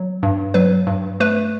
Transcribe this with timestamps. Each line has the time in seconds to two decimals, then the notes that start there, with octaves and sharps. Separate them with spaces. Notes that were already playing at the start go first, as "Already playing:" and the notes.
Already playing: F#3
0.23 G2
0.54 F#3 B4
0.87 G2
1.20 A3 B4